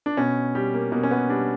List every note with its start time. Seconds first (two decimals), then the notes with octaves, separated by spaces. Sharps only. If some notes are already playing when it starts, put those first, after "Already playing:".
0.06 D4
0.17 B2 C#4
0.55 G3 G4
0.74 A#3
0.92 B2 A#3
1.03 C#4
1.11 B3
1.29 G3 D4